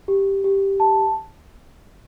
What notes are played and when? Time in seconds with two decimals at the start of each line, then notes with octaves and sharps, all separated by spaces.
0.08 G4
0.44 G4
0.80 A5